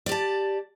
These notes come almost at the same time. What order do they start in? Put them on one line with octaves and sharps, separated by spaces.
D5 G4 A5